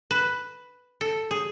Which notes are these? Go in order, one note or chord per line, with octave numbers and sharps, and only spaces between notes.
B4
A4
G#4